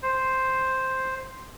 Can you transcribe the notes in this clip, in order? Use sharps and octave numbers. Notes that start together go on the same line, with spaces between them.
C5